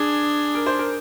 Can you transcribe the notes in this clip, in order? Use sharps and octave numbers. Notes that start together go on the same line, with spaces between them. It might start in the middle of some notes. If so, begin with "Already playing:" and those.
Already playing: D4 G#4
A#4
C5
A#4